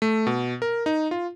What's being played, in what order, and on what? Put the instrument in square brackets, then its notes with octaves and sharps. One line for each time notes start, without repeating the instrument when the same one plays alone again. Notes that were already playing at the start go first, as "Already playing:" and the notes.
[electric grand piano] A3
B2
A#4
D#4
F4